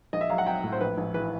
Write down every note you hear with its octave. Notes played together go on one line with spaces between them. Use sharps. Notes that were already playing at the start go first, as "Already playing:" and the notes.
A#1 D#5
E5
F#3 F5
F#5
F#3 G5
A2
C5
A#1 B4
A#1
E3 B4